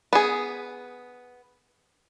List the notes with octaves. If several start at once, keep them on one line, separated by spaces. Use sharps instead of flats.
B3 G#4